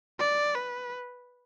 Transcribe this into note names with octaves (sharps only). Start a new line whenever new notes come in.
D5
B4